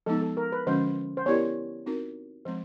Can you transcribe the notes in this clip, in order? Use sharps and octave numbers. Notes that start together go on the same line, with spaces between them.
F3 G#3 B3 D#4 A4
A4
A#4
B4
D3 F3 G#3 C#4 F#4 C5
C5
B3 E4 G4 A#4 C#5 D5
C4 D#4 F#4 A#4
F3 G#3 C4 C5